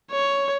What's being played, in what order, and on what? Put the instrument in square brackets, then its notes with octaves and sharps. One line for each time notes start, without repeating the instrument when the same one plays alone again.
[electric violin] C#5